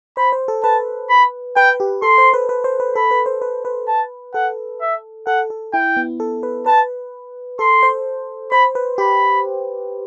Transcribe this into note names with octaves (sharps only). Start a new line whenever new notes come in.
C5 B5
C5
A4
B4 A5
B5
B4 G5
G4
A4 C6
C5
B4
B4
C5
B4
A4 B5
B4
C5
B4
B4
A5
A4 F#5
E5
A4 F#5
A4
E4 G5
B3
A4
B4
B4 A5
A4 C6
C5
C5 B5
B4
G4 B5